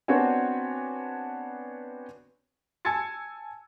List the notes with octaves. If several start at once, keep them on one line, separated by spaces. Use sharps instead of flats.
B3 C4 D4 F#4 C#5 G#5
G#5 A5 E6 G#6 A6 C#7